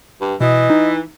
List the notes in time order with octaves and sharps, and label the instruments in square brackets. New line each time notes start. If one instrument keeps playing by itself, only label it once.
[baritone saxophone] G2
[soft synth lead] B2 [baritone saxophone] E3 [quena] D#5
[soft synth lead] D#4